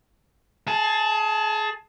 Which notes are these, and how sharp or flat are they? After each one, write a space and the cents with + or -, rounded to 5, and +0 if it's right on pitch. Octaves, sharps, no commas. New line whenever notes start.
G#4 +30 A5 +0